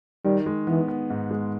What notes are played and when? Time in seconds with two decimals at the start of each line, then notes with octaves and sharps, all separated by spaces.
0.25 D#3 G3
0.46 G#3
0.67 E3 B3
0.88 B3
1.10 G#2
1.31 G#3